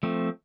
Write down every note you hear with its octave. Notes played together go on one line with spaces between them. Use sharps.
F3 A3 C4